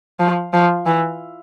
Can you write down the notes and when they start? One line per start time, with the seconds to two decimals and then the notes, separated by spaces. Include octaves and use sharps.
0.20 F3
0.54 F3
0.86 E3